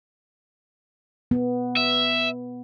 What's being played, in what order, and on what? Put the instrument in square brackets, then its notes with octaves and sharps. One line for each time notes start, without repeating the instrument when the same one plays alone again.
[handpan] B3
[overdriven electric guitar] E5